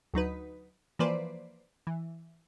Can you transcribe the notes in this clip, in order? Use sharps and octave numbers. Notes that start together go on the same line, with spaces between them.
D2 F#3 D#4 B4
E3 F3 A#3 B4 C5 D5
E3